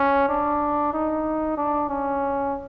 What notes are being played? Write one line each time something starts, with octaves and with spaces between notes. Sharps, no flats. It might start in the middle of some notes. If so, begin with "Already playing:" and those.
Already playing: C#4
D4
D#4
D4
C#4